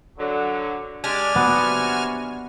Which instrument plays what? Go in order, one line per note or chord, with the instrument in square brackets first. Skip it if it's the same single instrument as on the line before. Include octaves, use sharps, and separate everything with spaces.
[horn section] D3 F#3
[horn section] G#3 G4 D5 [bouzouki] D4 [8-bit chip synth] G#5 F6
[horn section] C3 F#4 [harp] B3